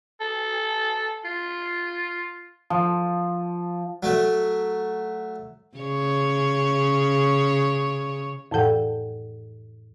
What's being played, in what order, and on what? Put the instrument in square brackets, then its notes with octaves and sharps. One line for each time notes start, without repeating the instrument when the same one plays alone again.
[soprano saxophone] A4
F4
[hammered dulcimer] F3
[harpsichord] F#3 A3
[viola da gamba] C#3 C#5
[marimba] F2 A2 E3 A4 F#5 G5